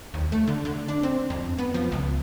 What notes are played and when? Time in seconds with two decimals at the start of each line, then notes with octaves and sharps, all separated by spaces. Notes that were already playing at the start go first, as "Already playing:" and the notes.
0.14 D#2
0.32 A3
0.47 D3
0.65 D3
0.88 D4
1.03 C4
1.30 F2
1.58 B3
1.74 F3
1.92 C#2